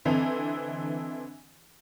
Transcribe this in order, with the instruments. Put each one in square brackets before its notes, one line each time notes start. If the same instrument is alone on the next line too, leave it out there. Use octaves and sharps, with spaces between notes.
[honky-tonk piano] D3 E3 C4 A4 D#5 F7